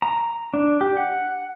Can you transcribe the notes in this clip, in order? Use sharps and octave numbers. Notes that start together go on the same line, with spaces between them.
A#5
D4
G4
F#5